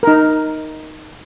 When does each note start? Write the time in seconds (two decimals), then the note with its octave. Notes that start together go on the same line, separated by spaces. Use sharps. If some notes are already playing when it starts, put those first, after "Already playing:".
0.03 D#4 A#4